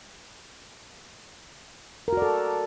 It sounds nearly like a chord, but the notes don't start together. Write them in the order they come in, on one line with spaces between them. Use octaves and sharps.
A#4 F#4 D5 A4